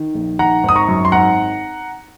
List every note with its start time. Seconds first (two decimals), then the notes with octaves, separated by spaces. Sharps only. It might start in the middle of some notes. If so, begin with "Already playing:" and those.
Already playing: D#3
0.15 A#1
0.39 D#3 F#5 A#5
0.63 G#1
0.69 D#6
0.76 A#5 C#6
0.88 F#2
1.05 C6
1.12 G#1 F#5 A#5